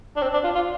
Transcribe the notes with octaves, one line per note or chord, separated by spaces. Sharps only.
D4
C4
D4
F4
F4